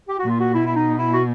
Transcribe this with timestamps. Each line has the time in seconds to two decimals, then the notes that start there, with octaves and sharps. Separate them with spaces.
0.09 G4
0.19 A#2 F#4
0.29 F4
0.40 F#4
0.54 B2 E4
0.66 E4
0.76 D#4
0.99 E4
1.13 F#4